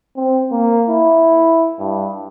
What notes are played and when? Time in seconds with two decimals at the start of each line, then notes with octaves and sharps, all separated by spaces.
0.16 C4
0.52 A#3
0.89 E4
1.79 G2